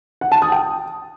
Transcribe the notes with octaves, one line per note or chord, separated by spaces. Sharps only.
F#5
A5
D#6
G5